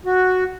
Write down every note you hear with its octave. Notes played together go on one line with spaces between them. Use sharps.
F#4